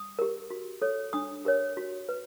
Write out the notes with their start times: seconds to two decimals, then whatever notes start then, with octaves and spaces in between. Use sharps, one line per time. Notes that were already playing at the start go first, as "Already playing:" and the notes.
Already playing: D#6
0.19 G4 A#4
0.50 F#4
0.82 A4 C#5
1.13 D4 D#6
1.45 G4 A#4 C#5
1.77 F#4
2.09 B4